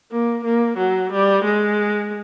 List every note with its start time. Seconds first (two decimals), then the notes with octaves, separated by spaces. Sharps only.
0.11 A#3
0.44 A#3
0.77 F#3
1.12 G3
1.44 G#3